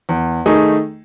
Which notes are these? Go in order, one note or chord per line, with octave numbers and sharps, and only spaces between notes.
E2
D#3 A3 D#4 G#4